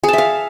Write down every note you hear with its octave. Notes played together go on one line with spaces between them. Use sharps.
G#4 E5 F5 A5